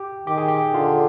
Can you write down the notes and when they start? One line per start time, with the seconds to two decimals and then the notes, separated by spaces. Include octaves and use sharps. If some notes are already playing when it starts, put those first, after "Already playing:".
Already playing: G4
0.27 D#3 G4
0.38 G#4
0.48 G4
0.74 D3 F4